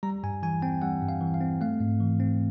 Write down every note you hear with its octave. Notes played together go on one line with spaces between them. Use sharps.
G3 A#5
G2 G#5
E3 G#5
C4 G5
G3 F#5
G2
F5
E3
F5
C4
A3 F5
G#2
E3
C4